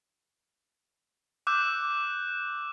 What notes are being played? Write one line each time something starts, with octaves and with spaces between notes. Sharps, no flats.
D6 E6 F#6 G6 E7